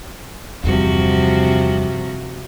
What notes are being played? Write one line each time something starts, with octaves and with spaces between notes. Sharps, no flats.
E2 G2 C3 F3 F#4